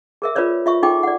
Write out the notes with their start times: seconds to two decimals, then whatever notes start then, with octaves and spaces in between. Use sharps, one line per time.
0.22 G#4 A#4 E5
0.35 F4 A#4 B4 C#5 D5
0.66 F4 E5 C#6
0.83 D#4 F4 G#4 A4 G5 D6
1.03 D5 F#5